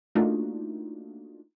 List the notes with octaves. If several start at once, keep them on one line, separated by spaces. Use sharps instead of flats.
A3 A#3 D4 D#4 F4 F#4